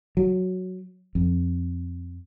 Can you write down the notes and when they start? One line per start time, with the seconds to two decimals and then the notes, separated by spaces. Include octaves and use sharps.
0.17 F#3
1.15 F2